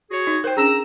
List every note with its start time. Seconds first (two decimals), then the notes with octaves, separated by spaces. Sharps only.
0.11 F#4 G#4 C#5
0.27 D#4
0.44 A#4 C5 G5
0.57 C#4 D4 G#4 A#5 E6